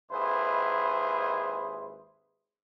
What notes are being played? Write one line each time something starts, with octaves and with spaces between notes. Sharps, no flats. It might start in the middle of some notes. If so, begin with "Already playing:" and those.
G#1 D#2 E4 G#4 B4 C5